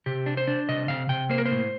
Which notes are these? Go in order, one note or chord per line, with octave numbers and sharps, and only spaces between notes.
C3 G4
D4
C5
D4
C3 D#5
C3 F5
C3 G5
A#3 C5
A#4
C5
A2